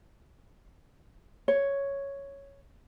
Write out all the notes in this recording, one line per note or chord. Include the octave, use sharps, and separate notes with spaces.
C#5